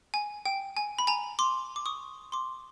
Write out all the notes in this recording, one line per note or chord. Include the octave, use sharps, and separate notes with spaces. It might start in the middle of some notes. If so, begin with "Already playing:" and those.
G#5
G5
G#5
B5
G#5 A#5
C6 D6
D6
C#6 D#6
C6 D6